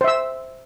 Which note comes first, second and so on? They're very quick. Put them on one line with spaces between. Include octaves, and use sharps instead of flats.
C5 E5 E6